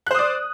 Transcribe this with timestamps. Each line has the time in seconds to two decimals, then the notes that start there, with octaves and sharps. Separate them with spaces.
0.06 F#6
0.11 C5
0.15 D#6
0.19 D5